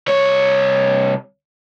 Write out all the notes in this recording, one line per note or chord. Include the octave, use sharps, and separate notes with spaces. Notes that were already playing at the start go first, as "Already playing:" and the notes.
C2 C#5